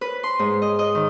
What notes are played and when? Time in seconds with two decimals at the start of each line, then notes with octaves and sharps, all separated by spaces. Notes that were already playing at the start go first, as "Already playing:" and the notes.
0.01 B4
0.23 C6
0.39 G#2
0.62 D#5
0.79 D#5
0.95 D#3